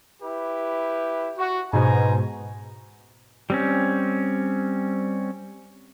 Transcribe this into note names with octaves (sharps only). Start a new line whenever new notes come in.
E4 G4 B4
F#4
G#2 B2 C5 G#5 A#5
G3 C4 C#4